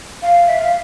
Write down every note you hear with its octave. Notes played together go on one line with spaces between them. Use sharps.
F5
E5
F5